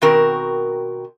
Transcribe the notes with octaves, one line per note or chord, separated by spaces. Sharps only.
B2 D#3 C4 F#4 A#4